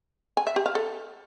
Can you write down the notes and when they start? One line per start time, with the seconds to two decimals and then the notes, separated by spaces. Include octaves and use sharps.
0.37 G#5
0.47 E5
0.56 G4
0.66 F5
0.75 A4